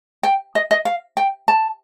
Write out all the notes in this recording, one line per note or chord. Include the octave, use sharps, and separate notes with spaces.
G5
D#5
D#5
F5
G5
A5